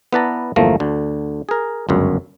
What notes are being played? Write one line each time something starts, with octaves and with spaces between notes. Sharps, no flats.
B3 E4 B4 D5 A5 A#5
G1 E2 F3 A3 A#3 A#5
D2 D3
G#4 A#4
G1 C#2 F#2